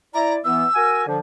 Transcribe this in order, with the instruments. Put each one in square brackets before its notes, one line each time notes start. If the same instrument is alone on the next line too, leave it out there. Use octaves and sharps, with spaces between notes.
[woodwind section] E4 D5 [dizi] A#5
[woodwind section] E3 B3 [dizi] E6
[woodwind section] F#4 A#4 G#5
D3 F3